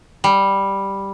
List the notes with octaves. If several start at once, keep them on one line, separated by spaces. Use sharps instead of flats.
G3